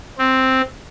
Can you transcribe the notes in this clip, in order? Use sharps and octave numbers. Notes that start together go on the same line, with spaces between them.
C4